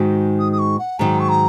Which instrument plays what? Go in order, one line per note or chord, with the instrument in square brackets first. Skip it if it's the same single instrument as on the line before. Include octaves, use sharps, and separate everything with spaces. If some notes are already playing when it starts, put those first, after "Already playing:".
Already playing: [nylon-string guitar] G#2 D#3 G#3 D#4 F#4
[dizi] D#6
D#6
C#6
F#5
[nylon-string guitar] G#2 D#3 F#3 [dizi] A#5
[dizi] C#6
A#5